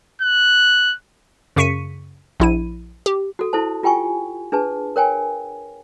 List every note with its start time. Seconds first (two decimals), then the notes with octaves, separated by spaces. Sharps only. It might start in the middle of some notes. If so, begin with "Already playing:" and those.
0.22 F#6
1.56 F#2 C#3 C#6 B6 C#7 D#7
2.40 A#1 E4 D#7
3.06 G4
3.39 F#4 A4
3.53 E4 A4 C5 A5
3.83 F4 G4 G5 G#5 C#6
4.52 D4 G#4 B4 A5
4.96 A#4 C#5 G5 G#5